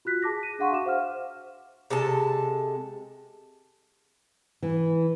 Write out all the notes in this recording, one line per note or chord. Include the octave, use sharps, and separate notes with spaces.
F4 F#4 F#6 B6
G#4 A5 D6 A#6
D#7
D4 G#4 F5 F#5 C6 C#6
F#4 E5 D6 E7
C5 F5 F#5 F6
C3 G#3 A4 A5
E3